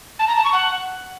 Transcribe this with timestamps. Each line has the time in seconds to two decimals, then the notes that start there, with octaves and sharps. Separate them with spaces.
0.19 A5
0.27 A#5
0.36 A5
0.44 C#6
0.52 F#5